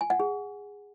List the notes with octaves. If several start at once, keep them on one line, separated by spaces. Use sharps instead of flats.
G#5
F#5
G#4